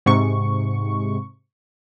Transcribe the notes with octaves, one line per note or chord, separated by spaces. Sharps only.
G#2 C3 C#6